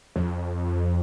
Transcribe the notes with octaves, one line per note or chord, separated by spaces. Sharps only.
F2